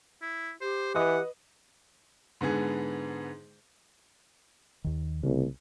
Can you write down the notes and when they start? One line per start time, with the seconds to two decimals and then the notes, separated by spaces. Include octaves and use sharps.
0.22 E4
0.61 G4 C5
0.95 E3 B4 D#5 F#5 D#6
2.41 G#2 D3 B3 G#4
4.84 D#2 D#3
5.23 C2 C#3 G3 A3